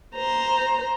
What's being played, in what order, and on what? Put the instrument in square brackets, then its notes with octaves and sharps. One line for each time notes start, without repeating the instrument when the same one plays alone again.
[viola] C5 A#5